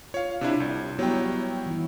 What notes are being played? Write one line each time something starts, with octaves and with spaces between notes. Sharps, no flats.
F4 C#5 F5
C3 D4 E4
C2
F#3 G3 B3 E4 C#5 G5
E3 E4